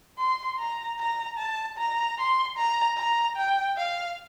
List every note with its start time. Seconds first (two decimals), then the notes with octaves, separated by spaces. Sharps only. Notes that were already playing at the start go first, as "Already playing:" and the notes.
0.18 C6
0.59 A#5
0.99 A#5
1.38 A5
1.77 A#5
2.18 C6
2.57 A#5
2.98 A#5
3.37 G5
3.77 F5